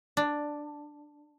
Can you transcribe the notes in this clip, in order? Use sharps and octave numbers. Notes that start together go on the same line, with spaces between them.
D4